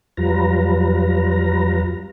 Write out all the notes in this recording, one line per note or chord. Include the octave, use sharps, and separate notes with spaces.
F2 F#3 G3 F4 B4 A#5